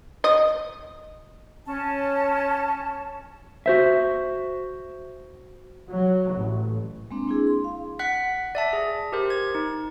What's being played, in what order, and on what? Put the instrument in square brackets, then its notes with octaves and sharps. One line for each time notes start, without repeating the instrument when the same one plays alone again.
[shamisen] D#5
[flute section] C#4 A5
[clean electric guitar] F#4 C5 E5
[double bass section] F#3
A1
[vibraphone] G#3 A#3 C4 D4
D4 E4 G#4
C6
F5
[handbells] F#5 F#6 B6
D5 E5 A5
G#4
G4 A#4 C5
G#6
D#4